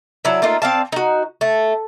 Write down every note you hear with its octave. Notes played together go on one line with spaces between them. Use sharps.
F#3 D4 E4
A3 A#3 D#4 F4
C4 D5 F5 A5
D#4 F#4
A3